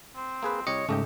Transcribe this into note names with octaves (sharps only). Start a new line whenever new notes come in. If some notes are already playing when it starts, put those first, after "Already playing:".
C4
A#3 G#4 B4
C2 G4 C#5 D#5 C#7
G#2 C#3 A3 G4 D#5 G5